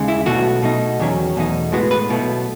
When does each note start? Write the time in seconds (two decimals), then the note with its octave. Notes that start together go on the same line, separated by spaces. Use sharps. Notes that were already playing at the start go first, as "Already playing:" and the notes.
Already playing: D#2 C#3 G#3
0.08 E4
0.26 B1 B2 A3 F#4
0.63 B2 A3 D#4
0.99 E2 D#3 F#3 C#4
1.36 E2 B2 A3 D#4
1.72 A2 G#3 B3 F#4
1.91 B4
2.09 B1 B2 A3